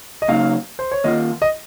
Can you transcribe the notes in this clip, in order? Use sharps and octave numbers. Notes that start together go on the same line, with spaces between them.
D#5
C#3 F#3 A#3 D#4 F5
C5
C#5
D#3 A#3 F4 D#5
D#5